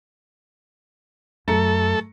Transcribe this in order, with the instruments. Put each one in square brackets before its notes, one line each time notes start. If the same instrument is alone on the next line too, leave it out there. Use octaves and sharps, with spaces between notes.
[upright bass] F#2 [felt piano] A3 A#5 C#7 [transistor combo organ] A4